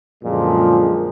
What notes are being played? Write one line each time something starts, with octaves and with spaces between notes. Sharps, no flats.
F#2 A#2 D3 F3 G#3